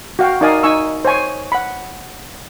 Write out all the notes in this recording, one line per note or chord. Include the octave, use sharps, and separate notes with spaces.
F#4 F5 G5
D#4 A#4 D5 F5 G#5 D#6
D#4 G#5 C#6 E6
C5 C#5 G#5 C#6
F#5 B5